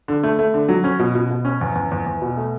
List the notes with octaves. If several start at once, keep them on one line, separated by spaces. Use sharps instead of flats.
D3
A3
A3
D3
F#3
C#4
B2
B2
B2
C#4
E2
E2
E2
E2
B2
A3